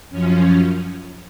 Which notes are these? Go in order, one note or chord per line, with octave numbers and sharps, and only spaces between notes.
F#2 F3 C#4